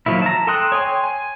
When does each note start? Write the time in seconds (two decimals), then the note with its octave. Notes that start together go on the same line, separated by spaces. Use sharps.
0.06 D#3 F3 F#3 A#3 E4
0.22 A5 A#5
0.47 A4 G5 C6 D#6 F#6
0.72 C#5 G5 G#5 C6
1.04 G#5